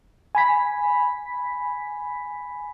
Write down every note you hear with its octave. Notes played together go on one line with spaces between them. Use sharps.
G#5 B5 B6